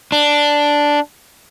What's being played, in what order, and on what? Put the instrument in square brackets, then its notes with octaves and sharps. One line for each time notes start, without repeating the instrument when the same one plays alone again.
[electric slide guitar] D4